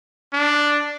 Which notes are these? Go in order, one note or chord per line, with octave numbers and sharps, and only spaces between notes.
D4